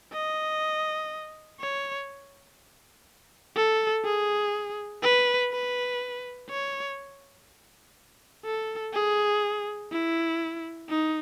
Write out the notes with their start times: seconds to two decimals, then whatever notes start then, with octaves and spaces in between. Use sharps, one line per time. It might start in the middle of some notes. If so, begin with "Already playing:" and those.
0.13 D#5
1.61 C#5
3.56 A4
4.05 G#4
5.03 B4
5.52 B4
6.50 C#5
8.45 A4
8.94 G#4
9.92 E4
10.90 D#4